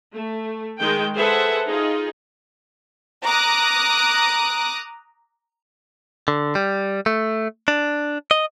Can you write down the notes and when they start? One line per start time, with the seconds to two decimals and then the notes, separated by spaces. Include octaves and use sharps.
0.13 A3
0.79 D#3 G#3 G5
1.15 G#4 A4 B4 C5 E5 F#5
1.69 D#4 F4 G#4
3.23 A#5 D6 D#6 F#6
6.28 D3
6.55 G3
7.06 A3
7.68 D4
8.31 D#5